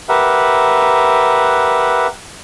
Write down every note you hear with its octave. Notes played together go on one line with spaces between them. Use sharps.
G4 A#4 B4 E5 F#5